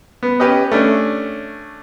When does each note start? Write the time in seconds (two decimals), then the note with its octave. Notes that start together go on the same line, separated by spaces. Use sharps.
0.23 B3
0.40 C#4 G4 B4 D#5
0.72 A3 C#4 D4